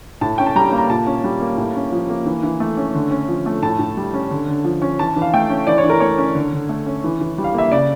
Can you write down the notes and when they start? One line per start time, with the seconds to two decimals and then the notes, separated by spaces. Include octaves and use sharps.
0.21 A2 A5
0.38 C#4 G5
0.46 A5
0.56 G3 A#5
0.72 A#3
0.78 A#5
0.89 A#2 A5
1.06 C#4
1.24 G3
1.41 A#3
1.58 A2
1.76 C#4
1.92 F3
2.10 A#3
2.26 E3
2.43 E3
2.60 A3
2.77 C#4
2.95 D3
3.11 C#4
3.28 F3
3.46 A3
3.63 A2 A5
3.79 A2
3.97 G3
4.14 C#4
4.31 D3
4.48 D3
4.64 F3
4.82 C#4
4.99 E3 A5
5.16 E3
5.22 F5
5.34 A3 G5
5.50 C#4
5.67 E3 D5
5.78 C#5
5.84 E3
5.90 A#4
6.00 A3 C#5
6.18 C#4
6.35 D3
6.53 D3
6.69 A3
6.86 C#4
7.04 E3
7.21 E3
7.38 G3
7.44 F5
7.54 A#3 E5
7.72 C#3 D5